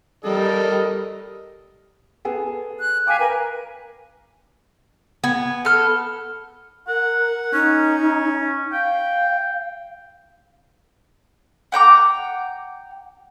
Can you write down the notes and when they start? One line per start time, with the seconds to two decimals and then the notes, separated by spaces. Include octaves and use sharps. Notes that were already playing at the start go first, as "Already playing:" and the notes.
0.24 G3 A4 A#4 D#5
2.25 B3 G#4 A4
2.80 F#6
3.07 F5 G5 G#5 D6 B6
3.19 A#4 B4 G#5
5.24 B3 G#5
5.65 A4 F6
6.88 A#4 F#5
7.53 C#4 D#4
8.73 F5 G5
11.72 F#5 G5 A#5 D6